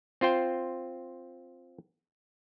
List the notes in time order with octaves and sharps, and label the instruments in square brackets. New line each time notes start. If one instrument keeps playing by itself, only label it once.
[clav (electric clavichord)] C4 F4 C5 G5